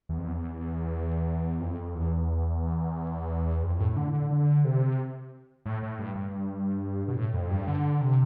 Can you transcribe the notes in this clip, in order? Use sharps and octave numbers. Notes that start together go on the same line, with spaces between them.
E2
F2
E2
F2
E2
F2
A2
D3
D3
D3
C3
A2
A2
G2
G2
B2
A2
F2
G2
D3
C3